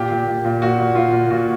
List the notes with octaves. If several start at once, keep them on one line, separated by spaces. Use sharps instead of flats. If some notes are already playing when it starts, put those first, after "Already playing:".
Already playing: A#2 G4
A#2
A#2
A#2
A#2 F#4
A#2
A#2 F4
A#2
A#2 F#4